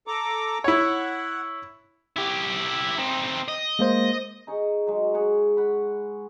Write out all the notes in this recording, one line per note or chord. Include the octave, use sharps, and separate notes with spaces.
A4 A#5 D6
E4 C#5 F#5
E4 G4
C4 D#4
D#5
G#3 A#3 C5
D#4 G#4 C#5
F#3 G#3
G#4 C#5 F#5
F#5 B5